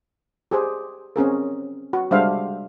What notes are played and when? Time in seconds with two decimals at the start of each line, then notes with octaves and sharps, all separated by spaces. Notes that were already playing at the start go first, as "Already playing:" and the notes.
0.51 G4 G#4 C5
1.16 C4 C#4 G#4 A#4
1.93 F#4
2.11 G3 G#3 D4 C5 E5 F5